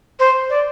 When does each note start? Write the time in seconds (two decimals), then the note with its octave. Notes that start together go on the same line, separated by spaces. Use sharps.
0.19 C5
0.50 D5